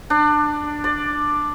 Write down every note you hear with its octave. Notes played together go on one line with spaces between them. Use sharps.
D4
D5